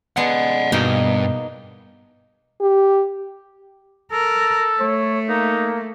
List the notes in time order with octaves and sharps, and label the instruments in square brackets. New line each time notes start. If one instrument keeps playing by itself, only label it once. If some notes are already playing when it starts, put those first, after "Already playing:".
[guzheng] G#3 B3 [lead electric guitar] D5 F#5
[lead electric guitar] G2 [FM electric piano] B2 [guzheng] A#3 B3 D#4
[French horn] G4
[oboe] A4 [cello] A#4
[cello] A3 [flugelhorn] C#5
[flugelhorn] A#3 [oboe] D#4